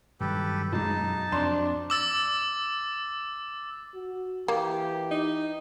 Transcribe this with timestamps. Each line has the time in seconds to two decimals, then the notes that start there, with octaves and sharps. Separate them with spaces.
0.21 G2 D#3 F#3 G4 A4 B4
0.72 B1 F#2 G#3 D#4 A5
1.32 F2 C3 D4 C6 E7
1.90 D6 E6 A6
3.95 F#4
4.48 E3 A#3 G4
5.11 D#4